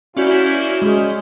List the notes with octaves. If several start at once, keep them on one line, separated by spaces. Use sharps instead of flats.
F#2 A#3 C#4 E4 F#4 D5 F6 G6
G#3 G#4